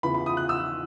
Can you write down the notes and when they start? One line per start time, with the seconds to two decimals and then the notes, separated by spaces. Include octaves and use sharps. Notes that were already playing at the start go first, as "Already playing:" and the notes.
0.03 E2 C#3 E3 B5
0.14 B5
0.26 D#6
0.37 F#6
0.49 E6